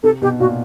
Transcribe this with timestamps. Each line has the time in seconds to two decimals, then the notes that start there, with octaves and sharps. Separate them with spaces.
0.03 C3 A4
0.22 B2 G4
0.40 A#2 F#4